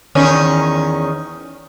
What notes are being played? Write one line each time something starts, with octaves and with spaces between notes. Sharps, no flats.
E2 D#3 C#4